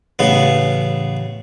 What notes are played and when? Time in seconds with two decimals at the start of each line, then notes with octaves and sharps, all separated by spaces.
0.19 A1 C#3 B3